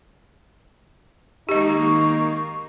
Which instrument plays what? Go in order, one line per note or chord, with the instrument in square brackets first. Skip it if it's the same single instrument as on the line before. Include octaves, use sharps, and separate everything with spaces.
[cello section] D#3 G#3 A#3 [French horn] D#4 [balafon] G4 D#5 [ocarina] C#6